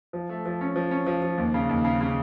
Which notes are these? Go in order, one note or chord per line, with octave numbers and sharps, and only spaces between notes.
F3
A3
F3
C#4
F3
C#4
F3
F3
D#2
C#3
D#2
C#3
C#3